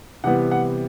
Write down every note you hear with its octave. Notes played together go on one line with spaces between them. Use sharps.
C3 E3 G3 B3 F#5
F#5